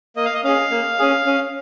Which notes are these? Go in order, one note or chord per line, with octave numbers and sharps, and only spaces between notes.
A#3 D#5
F5
D#5
C#4 G#4 F5
A#3
C#4 G#4
C#4